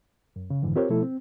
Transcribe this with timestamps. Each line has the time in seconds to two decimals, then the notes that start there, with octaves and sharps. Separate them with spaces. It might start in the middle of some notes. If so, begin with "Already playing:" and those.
0.36 F#2
0.50 C#3
0.62 F2 G#2 D3 E3
0.76 C4 F4 G4 A#4 C5 C#5
0.90 B2 F3 A3 E4 A4
1.03 C4